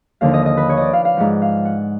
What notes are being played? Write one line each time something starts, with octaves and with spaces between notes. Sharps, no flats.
D#2 D3 F3 F5
D#5
D#5
B4
C#5
D5 D#5
F5
F5
G#2 F3 F#5
F5
F#5